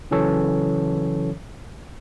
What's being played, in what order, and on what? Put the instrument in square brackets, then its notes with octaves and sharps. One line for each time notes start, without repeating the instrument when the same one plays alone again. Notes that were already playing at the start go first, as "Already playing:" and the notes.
[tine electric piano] C#3 E3 F#3 C#4 A4 C#5